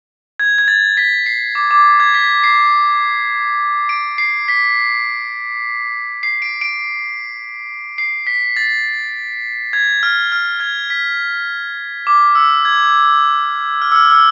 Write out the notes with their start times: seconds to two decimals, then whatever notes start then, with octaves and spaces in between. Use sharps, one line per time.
0.40 G#6
0.58 G#6
0.68 A6
0.97 B6
1.26 C7
1.55 D6
1.71 D6
2.00 G#6
2.14 B6
2.44 C7
3.89 D7
4.18 C7
4.48 B6
6.23 C7
6.42 D7
6.61 D7
7.98 C7
8.27 B6
8.56 A6
9.73 G#6
10.03 F6
10.32 F6
10.60 G#6
10.90 B6
12.07 D6
12.35 E6
12.65 G#6
13.82 F6
13.92 E6
13.96 F6
14.11 E6